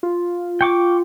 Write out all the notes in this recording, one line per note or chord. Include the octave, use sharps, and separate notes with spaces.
F4
G5 C#6 D6